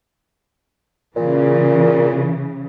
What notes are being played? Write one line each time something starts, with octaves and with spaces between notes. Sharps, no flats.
A#2 C#3 E3